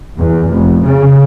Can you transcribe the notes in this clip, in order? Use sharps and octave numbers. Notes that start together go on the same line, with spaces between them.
E2
F1
C#3